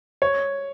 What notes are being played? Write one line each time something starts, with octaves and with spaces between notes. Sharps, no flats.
C#5